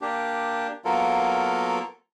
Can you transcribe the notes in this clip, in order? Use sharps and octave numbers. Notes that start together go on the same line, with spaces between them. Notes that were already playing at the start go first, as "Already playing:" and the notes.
A#3 D4 G4
F#3 A#3 B3 F4 A4 A#4